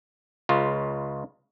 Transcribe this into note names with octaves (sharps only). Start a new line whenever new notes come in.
C#2 C#3 F4